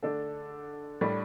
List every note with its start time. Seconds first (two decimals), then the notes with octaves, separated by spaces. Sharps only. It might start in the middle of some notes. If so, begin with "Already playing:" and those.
0.03 D3 A3 D4 A4
1.01 A2 G3 D4